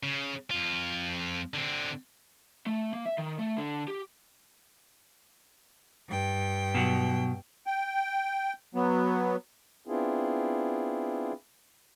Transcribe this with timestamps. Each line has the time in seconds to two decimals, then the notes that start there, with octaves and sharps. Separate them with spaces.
0.03 C#3
0.51 F2 F4
1.54 D3 C4
2.67 A3
2.93 A#3
3.06 E5
3.18 D#3
3.38 A3
3.57 D3
3.88 G4
6.07 G2 G5
6.75 B2 F#3
7.67 G5
8.75 F#3 B3
9.87 B3 C4 D4 E4 F4 G#4